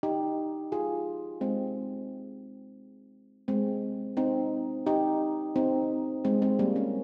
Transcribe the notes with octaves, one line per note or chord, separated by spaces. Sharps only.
D#4 G4
F4 G#4
G#3 C4
G#3 C4
C4 D#4
D#4 G4
C4 D#4
G#3 C4
G#3 C4
G3 A#3
A#3 C#4